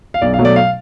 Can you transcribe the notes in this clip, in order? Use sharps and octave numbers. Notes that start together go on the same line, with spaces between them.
F5
B1 D5
F5
B2 F#3 A3
D5
F5